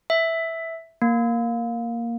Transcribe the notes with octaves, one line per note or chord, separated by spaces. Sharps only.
E5
A#3